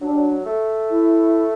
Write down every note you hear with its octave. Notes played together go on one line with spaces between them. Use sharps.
F#3 D4
G3
F#3
A3
E4